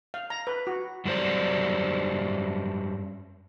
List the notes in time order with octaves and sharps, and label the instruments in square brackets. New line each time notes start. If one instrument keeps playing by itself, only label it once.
[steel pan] F5
A#5
B4
F#4
[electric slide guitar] F#2 F#3 G3 F#4 C5 D5